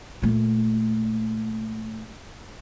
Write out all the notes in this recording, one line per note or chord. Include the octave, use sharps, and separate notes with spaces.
A#2 A3